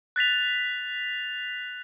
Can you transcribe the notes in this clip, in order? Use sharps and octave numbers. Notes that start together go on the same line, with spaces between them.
F#6 A6 B6 F7